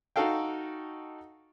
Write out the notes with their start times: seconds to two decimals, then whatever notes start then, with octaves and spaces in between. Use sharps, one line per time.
0.16 D#4 F#4 A4 F5 G5